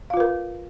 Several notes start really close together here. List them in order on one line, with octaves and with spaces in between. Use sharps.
F5 F4 B4 A#4